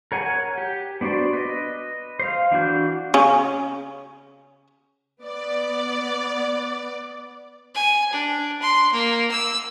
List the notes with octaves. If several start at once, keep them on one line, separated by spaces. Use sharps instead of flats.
A#4 C#5 F#5 G#5
G4
B3 D4 F#4 C5 D5
B4 D#5
C5 F5
E3 D4 F#4 G6
C#3 C#4
B3 D5
G#5
D4
C6
A#3
E6